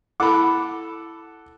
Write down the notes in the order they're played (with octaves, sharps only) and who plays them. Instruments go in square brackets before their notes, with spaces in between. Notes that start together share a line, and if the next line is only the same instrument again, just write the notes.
[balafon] E4 B5 [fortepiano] A4 F#5 D6